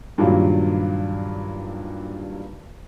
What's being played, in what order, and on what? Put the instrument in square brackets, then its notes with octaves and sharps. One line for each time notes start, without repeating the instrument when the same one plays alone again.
[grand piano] G2 A#2 D#3 F#3 F4